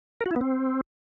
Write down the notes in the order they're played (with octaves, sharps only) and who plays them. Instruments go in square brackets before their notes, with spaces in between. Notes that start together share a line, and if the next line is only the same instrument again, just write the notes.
[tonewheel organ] A#4
F#4
E4
B3
C4